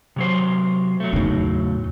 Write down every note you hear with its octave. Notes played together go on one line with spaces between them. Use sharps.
C3 F#3 C5
F#3 A3
E2 A2 C#3 F#3 D#4